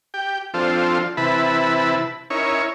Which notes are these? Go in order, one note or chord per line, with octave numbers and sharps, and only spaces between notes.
G4 G5
F3 C4 D4 F4 A4
C3 E3 E4 B4 A5 B5
C#4 D#4 E4 A#4 C#5